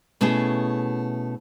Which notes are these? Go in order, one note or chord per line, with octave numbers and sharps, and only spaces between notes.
B2 A3 C#4 E4 G#4